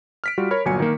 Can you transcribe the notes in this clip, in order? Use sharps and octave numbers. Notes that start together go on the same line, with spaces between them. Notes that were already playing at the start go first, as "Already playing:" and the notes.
F6 B6 D7
G3 F4 F#4
A#4 C#5 B5 F6
G1 A#2 F#3 G#5 C#7
D#3 A#3